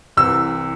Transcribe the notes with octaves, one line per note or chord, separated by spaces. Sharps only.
C2 C3 E3 E6